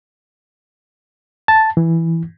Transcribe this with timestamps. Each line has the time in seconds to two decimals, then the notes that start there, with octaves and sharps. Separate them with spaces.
1.48 A5
1.77 E3